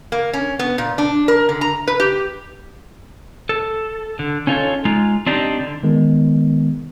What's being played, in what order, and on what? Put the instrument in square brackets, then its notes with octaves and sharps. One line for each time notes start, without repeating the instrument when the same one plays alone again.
[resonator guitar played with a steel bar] A#3
C#4
B3
A#2
D4
A#4
D3
A#5
B4
G4
[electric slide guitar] A4
D3
C#4 D#4 F4 A4 C#5
G#3 D#4 F4
C4 D4 D#4 G4
D3
[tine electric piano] D#3 G#3 B3